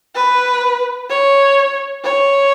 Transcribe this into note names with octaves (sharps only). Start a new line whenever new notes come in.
B4
C#5
C#5